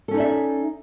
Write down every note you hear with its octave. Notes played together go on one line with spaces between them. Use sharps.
C#4 D#4 A4 D5 E5